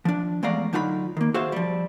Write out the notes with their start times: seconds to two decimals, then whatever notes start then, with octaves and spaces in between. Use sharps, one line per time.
0.05 F3 D4
0.43 E2 G#3 A3 D5 F5 A#5
0.73 D3 F#3 D#4 F4 F#5 B5
1.17 D#3 A#3
1.34 F#4 G#4 C5 E5 F5
1.52 F3 G3